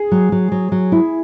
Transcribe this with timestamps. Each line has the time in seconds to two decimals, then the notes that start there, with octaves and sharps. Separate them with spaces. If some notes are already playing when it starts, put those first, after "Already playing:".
Already playing: G#4
0.12 F#3
0.32 F#3
0.52 F#3
0.72 F#3
0.92 E4